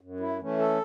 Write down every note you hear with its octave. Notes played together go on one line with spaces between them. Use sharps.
F#2
E4
E3 A3 C#4
A4